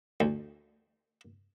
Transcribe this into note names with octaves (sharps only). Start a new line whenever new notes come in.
D2